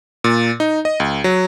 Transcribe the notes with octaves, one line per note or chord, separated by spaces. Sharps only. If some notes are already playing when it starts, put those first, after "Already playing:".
A#2
D#4
D#5
C#2
F#3